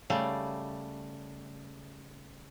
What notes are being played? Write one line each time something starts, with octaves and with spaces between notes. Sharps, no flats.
C#3 G3 A3